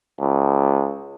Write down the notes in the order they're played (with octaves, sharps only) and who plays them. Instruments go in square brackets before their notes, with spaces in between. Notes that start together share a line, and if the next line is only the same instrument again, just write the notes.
[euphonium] C#2